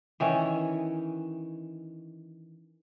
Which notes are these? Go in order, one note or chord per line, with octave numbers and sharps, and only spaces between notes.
D#3 E3 C#4